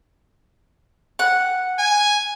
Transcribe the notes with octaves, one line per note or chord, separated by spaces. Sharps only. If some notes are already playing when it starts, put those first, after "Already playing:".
F#5
G#5